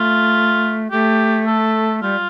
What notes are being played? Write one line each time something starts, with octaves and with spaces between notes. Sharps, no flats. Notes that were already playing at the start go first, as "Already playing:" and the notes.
Already playing: A3 F4
A3 G4
A4
G3 F4